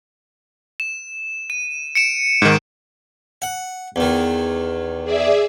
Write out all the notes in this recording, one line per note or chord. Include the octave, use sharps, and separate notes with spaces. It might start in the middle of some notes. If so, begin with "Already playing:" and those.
E7
D#7
C#7 D7 E7
G#2 D#3
F#5
E2 D#3
G#4 D5 E5